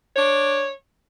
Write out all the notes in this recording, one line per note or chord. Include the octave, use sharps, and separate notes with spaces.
D4 C#5